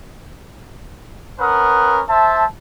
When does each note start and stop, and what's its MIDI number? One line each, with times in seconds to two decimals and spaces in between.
1.40 2.02 61
1.40 2.02 70
1.40 2.02 71
1.40 2.02 78
1.40 2.02 87
2.09 2.44 72
2.09 2.44 76
2.09 2.44 81